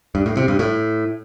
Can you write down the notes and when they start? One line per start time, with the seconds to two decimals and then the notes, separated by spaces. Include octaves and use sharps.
0.15 G2
0.26 A2
0.37 C3
0.48 G2
0.59 A2